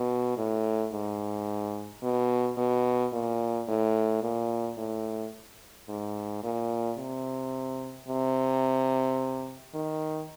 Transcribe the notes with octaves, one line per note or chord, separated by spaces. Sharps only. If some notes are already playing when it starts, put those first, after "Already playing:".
Already playing: B2
A2
G#2
B2
B2
A#2
A2
A#2
A2
G#2
A#2
C3
C3
D#3